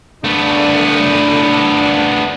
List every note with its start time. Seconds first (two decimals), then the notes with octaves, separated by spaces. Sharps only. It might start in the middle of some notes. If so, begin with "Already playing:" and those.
0.24 A3 B3 D4